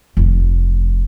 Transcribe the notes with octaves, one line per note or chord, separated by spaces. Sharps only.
F1